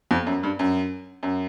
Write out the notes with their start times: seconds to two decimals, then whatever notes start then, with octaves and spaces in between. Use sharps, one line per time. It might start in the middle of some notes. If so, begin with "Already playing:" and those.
0.11 F2
0.27 F#2
0.43 G2
0.59 F#2
1.23 F#2